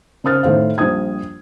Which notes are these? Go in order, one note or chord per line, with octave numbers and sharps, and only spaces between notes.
C#3 A#4 C5 D#6 F6 A6
A2 D#3 A3 C5 F5
A#1 G3 C5 D#6 G#6